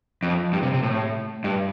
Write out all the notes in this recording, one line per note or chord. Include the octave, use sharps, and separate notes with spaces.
F2
G2
C3
C3
A2
G2